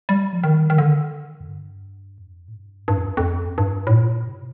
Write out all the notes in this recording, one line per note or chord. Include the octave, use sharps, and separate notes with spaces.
G3
F3
D#3
D#3
D3
F2
G2
F2
A2
G2
G2
F2
F2
G2
A2
A#2
C3